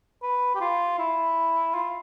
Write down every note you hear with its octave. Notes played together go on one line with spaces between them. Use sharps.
B4
G4
F4
E4
F4